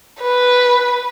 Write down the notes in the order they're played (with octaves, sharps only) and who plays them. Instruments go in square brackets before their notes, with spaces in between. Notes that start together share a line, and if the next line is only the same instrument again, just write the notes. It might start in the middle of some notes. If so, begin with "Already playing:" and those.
[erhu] B4